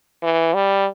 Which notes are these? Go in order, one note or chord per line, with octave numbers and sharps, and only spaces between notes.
E3
G3